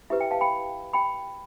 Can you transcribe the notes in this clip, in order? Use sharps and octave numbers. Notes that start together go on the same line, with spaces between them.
E4 G4 B4 E5
E5 G5
F5 A5
G5 B5
G5 B5